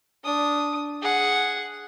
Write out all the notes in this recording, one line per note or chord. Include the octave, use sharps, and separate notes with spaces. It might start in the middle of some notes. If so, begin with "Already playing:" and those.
D4 D#6
G#4 F#5